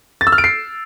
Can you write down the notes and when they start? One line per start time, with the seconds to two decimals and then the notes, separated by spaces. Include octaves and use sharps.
0.21 A6
0.27 E6
0.32 F6
0.38 D7
0.44 C7